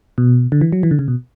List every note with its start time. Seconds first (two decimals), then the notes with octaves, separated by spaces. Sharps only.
0.18 B2
0.52 D3
0.61 E3
0.72 F#3
0.83 E3
0.91 D3
0.99 C#3
1.08 B2